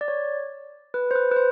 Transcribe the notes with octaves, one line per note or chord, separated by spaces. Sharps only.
D5
C#5
B4
C5
B4
B4
C5